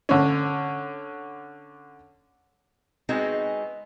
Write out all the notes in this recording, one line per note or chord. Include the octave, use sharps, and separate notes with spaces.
D3 C#4
G#3 B3 C4 D#4 F#4 G#4